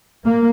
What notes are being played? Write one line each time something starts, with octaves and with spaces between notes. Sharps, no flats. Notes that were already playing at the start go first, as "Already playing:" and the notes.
A#3